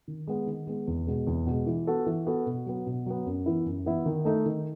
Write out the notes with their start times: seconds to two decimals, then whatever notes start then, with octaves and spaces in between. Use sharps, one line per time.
0.08 D#3
0.27 G#3 B3
0.47 D#3
0.67 G#3 B3
0.87 E2
1.07 B2 G#3
1.27 E2
1.47 B2 G#3
1.67 E3
1.87 B3 F#4 A4
2.06 E3
2.26 B3 F#4 A4
2.46 B2
2.66 F#3 B3
2.86 B2
3.06 F#3 B3
3.26 F#2
3.46 E3 B3 E4
3.66 F#2
3.86 E3 B3 E4
4.06 D#3
4.25 A3 D#4 A4
4.46 D#3